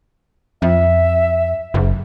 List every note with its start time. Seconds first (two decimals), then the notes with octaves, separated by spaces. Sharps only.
0.62 F2 E5
1.74 F#1